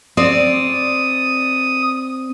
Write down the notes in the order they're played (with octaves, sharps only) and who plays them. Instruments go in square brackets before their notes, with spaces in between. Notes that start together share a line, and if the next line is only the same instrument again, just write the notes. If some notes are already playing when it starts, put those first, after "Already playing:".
[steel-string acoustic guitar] C4 D5 [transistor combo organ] D#6